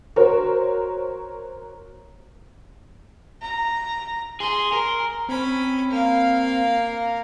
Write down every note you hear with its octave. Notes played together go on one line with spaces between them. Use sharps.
F#4 A#4 C5 C#5
A#5
G#4 C6
A#4
C4 C#4 B5
A#3 F5